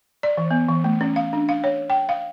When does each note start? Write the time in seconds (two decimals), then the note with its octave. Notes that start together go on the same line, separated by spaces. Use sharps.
0.23 D5
0.37 E3
0.51 B3
0.69 E3
0.84 A3
1.01 C#4
1.16 F5
1.33 D4
1.49 F5
1.64 C#5
1.90 G5
2.09 F5